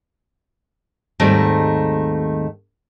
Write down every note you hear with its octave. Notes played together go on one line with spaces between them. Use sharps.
D#2 G#2 D#3 G3 A3 C4